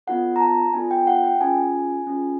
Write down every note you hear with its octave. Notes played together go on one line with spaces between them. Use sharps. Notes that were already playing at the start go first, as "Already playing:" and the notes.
B3 D4 F4 A4 F#5
A#5
A5
B3 D4 F4 A4 G#5
G5
F#5
G5
C#4 F4 G#4 G#5
C#4 F4 G#4